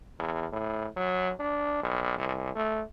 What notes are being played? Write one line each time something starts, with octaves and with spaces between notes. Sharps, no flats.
E2
A2
F#3
D4
B1
C2
A3